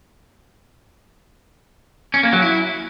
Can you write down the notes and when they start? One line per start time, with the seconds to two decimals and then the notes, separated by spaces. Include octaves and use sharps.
2.14 C#4
2.23 A#3
2.33 F#3
2.42 E4